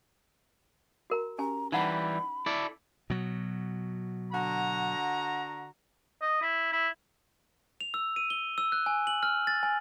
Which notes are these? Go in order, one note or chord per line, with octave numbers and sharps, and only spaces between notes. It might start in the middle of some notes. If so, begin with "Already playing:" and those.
F#4 A#4 A#5
C#4 G4 G#5 A#5
E3 G3 D#4 F#5 A#5 B5
E4 A4 D5
B2 F#3
D3 F#4 A#5
D#5
E4
E4
F7
E6
D#7
G7
E6
F#6
G#5
F#7
F6
A6
G#5